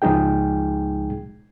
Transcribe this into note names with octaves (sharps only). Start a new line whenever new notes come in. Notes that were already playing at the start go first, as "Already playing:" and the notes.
C#2 F3 G#3 D#4 G#4 G5